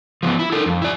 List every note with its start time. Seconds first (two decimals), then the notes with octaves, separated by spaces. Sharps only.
0.23 F3 A#3 B3
0.39 E4
0.52 D#4 A4 A#4
0.66 F2
0.82 E4 D5